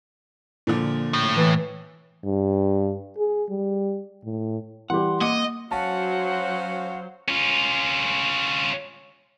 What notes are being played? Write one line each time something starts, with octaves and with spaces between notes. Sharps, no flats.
A#2 D3 F3
A2
E3
G2
G#4
G3
A2
E3 G3 G4 F#5 C6
A#3 D#5 F#5 D6 C#7
F#3 C#4 F#4 C5 F5 F#5 A5
C#4 F4